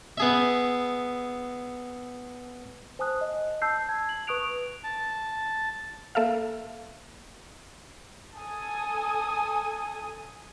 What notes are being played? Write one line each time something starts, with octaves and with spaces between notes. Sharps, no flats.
B3 G#4 E5
C5 G#5 A5 D#6 F#6
D#5
A5 E6 G6 C7
A5 G#6
F#7
B4 C#6 D#6 F#6 D7 F7
A5
A#3 A4 E5 F5
A4 G#5 D#6